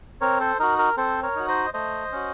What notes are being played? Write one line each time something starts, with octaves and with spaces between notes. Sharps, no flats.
C4 A#4 C#5
A4 C5
D#4 F#4 A#4
A#4
C4 A4 C5
A#4 C#5
D#4 F#4
C5 D#5
A3 C5 D#5
C#4 F#4